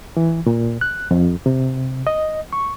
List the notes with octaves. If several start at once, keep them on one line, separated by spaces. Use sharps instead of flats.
E3
A#2
F#6
F2
C3
D#5
C#6